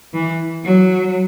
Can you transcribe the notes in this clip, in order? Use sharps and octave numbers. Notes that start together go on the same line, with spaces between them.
E3
F#3